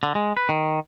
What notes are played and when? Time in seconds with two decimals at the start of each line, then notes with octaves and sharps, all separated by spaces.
0.03 D3
0.15 G#3
0.37 B4
0.49 D#3